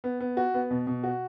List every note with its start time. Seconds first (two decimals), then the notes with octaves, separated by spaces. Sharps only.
0.04 B3
0.20 B3
0.37 F#4
0.54 B3
0.71 B2
0.87 B2
1.04 F#4